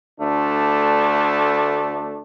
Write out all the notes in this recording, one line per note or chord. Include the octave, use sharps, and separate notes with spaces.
D2 A3 D4